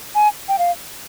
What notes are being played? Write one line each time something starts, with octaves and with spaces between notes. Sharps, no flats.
G#5
G5
F5